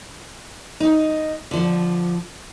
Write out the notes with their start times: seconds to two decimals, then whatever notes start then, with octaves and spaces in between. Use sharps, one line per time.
0.80 D#4
1.51 D3 F3